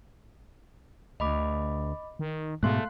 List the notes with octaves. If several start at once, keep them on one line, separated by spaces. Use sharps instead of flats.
D2 D#5 B5 D6
D#3
G#2 B2 G#3 A3 F5 C6 F#6